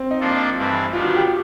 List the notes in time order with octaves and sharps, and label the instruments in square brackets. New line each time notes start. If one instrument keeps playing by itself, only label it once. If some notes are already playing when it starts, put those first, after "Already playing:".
Already playing: [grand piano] C4
D#4
[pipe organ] F3 A#3 D4 F4 A4
G2 E3 A3 C4
[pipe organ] D#3 G3 B3 D4 [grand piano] F4
[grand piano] F#4
G4